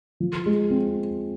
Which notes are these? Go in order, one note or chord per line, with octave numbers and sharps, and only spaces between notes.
F3
G#3
C4